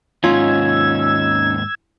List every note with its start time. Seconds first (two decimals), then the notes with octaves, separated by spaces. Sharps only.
0.24 D#2 G#2 C#4 D#4 F4 E6 G#6